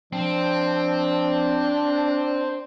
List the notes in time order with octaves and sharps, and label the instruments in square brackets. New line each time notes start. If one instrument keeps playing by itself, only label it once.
[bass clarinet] F3 [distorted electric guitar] C4 [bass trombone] D4